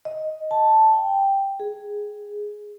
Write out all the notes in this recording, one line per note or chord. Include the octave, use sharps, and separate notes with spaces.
D#5
A5
G5
G#4